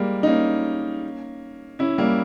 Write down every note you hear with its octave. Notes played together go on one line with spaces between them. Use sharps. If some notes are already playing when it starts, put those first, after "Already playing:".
Already playing: G3 G#3 A#3
D#4
A#3 C#4
C#4 E4
G3 A#3